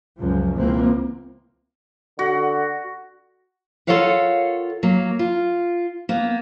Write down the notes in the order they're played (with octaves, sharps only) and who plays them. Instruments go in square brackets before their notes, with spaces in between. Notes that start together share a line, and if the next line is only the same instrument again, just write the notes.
[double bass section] C#2 F#2 F3
C#2 E3 A#3 C4
[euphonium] D3 [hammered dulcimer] F#4
[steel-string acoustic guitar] F4 A4 A#4 C#5 F5 F#5
F#3 A#3
F4
A#3 B3